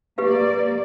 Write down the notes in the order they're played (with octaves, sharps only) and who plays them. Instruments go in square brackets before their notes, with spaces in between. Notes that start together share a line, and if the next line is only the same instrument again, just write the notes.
[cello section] A#3 D5 [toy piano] G4 B4 F5